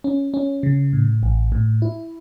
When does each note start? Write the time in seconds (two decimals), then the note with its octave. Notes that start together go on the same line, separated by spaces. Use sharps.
0.04 C#4
0.34 C#4
0.63 C#3
0.93 A2
1.23 A1
1.52 A2
1.82 E4